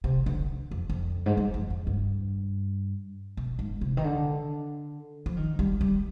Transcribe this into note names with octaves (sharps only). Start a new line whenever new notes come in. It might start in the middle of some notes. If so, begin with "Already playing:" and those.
C3
D3
F2
F2
G#2
G2
F2
F2
G2
B2
G#2
C3
D#3
D3
F3
D#3
G3
G3